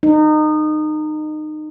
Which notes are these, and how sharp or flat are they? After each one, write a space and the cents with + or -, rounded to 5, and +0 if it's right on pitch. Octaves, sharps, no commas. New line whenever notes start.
D#4 -25